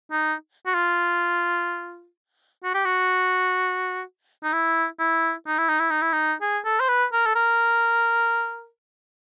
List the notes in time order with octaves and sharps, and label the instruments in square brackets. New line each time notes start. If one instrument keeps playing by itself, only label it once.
[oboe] D#4
F#4
F4
F#4
G4
F#4
D#4
E4
E4
D#4
E4
D#4
E4
D#4
E4
D#4
G#4
A4
C5
B4
A#4
A4
A#4